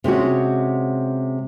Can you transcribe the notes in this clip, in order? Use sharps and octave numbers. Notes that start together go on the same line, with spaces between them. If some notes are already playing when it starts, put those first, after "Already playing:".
C3 G#3 C#4 F#4